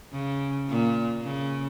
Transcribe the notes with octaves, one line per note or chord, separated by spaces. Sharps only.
C#3
A#2
C#3